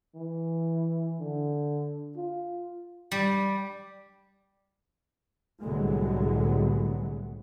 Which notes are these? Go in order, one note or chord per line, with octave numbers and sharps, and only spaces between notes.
E3
D3
F4
G3
C2 A2 D3 F#3 G#3 B3